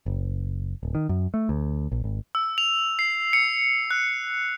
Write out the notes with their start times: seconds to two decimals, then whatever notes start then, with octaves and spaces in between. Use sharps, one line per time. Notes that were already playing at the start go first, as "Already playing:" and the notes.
0.06 F#1
0.83 D1
0.95 D#3
1.09 F#2
1.34 A3
1.49 D2
1.92 A#1
2.04 G#1
2.35 E6
2.58 F7
2.99 C7
3.33 C#7
3.91 F#6